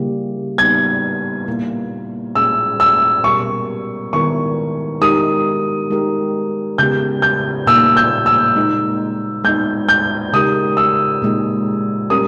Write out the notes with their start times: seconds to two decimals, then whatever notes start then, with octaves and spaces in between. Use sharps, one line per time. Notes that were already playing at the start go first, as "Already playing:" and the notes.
Already playing: C#3 G3 A#3 E4 G4
0.58 G3 B3 D#4 G#6
1.47 A#2 A#3 E4
2.35 A#2 G#3 C#4 G#4 E6
2.80 E6
3.24 B2 G3 B3 G4 A#4 C#6
4.13 D#3 G#3 B3 E4 A#4 C#6
5.01 G#3 D#4 G4 A#4 D#6
5.90 G#3 D#4 G4 A#4
6.78 C#3 G#3 B3 G4 G6
7.22 G6
7.67 A#2 G3 A#3 D#4 E6
7.97 G6
8.26 E6
8.56 G#3 D#4 A#4
9.44 G#3 B3 D#4 G6
9.89 G6
10.33 C#3 G#3 D#4 G4 A#4 D#6
10.77 E6
11.22 A#2 G#3 D#4
12.10 G3 C#4 G4 A#4 D#6